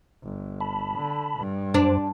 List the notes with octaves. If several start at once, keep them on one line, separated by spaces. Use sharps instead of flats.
G1
A5 B5
D3
G2
F#2 D4 C5